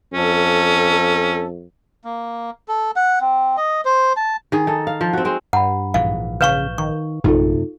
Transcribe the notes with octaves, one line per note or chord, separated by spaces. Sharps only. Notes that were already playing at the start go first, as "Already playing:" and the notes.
F2 C#4 A4
A#3
A4
F#5
C4
D#5
C5
A5
D#3 G#4
D#4 A4
F5
F3
C4 F#4
G#3 C4
G2 F#5 A#5 B5
A#1 G#2 E3 F5
C#3 B4 F5 C#6 G6 E7 G7
D#3 C#6
A#1 F#2 C3 A3 D#4 F4 A4